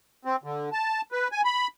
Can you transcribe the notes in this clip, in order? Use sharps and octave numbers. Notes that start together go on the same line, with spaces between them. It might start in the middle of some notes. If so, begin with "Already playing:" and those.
C4
D3
A5
B4
G#5
B5